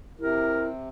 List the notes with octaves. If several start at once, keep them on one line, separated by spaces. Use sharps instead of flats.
C3 E4 A#4